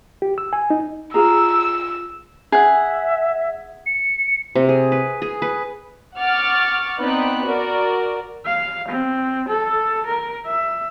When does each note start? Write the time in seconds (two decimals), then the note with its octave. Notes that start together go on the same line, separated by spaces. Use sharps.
0.22 G4
0.38 E6
0.53 G#5
0.70 D#4
1.14 F4 G#4 A#5 E6
2.52 G#4 E5 F#5
3.86 C#7
4.55 C3
4.69 G#4
4.92 B4
5.22 G#4
5.42 B4
6.18 F#5 C#6 D6 F6 A6
6.99 B3 C4 D#4 D5 B5 F#6
7.45 F#4 A#4 D5
8.45 F5
8.88 C4
9.48 A4
10.06 A#4
10.46 E5